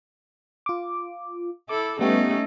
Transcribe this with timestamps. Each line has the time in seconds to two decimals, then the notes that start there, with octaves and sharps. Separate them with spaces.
0.66 F4 D6
1.69 E4 A4 D6
1.99 G3 A3 B3 C#4 D#4 G4